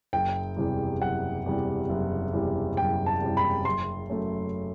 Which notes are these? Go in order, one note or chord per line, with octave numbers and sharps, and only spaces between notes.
F#1 G5
E2 C3 G3
F#1 F#5
E2 C3 G3
F#1
E2 C3 G3
F#1 G5
A5
E2 C3 G3
B5
F#1 C6
F#2 F#3 A3